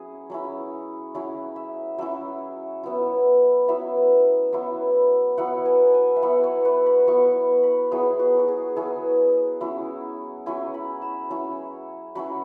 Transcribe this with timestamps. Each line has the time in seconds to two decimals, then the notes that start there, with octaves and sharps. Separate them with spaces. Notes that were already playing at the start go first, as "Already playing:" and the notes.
Already playing: F#3 C#4 E4 G#4
0.30 F#3 C#4 E4
1.15 F#3 C#4 E4
1.56 E5
1.98 F#3 C#4 E4 E5
2.83 F#3 B3 E4
3.68 F#3 B3 E4 E5
4.53 F#3 B3 E4
5.38 F#3 B3 E4 F#5
5.65 G#5
5.94 G#5
6.16 E5
6.22 F#3 B3 E4 F#5
6.44 C#5
6.65 B4
6.86 B5
7.07 F#3 B3 E4 C#6
7.63 B5
7.91 F#3 B3 E4 G#4
8.19 F#4
8.39 F#4
8.48 G#4
8.76 F#3 B3 E4 G#4
9.61 F#3 C#4 E4
10.46 F#3 C#4 E4 G#5
10.74 B5
11.02 E6
11.31 F#3 C#4 E4
12.15 F#3 C#4 E4 B5